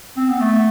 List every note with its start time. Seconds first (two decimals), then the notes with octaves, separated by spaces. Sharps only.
0.17 C4
0.29 B3
0.40 A3